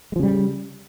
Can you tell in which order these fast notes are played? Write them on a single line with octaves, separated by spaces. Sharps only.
G#3 F3 C#3 G3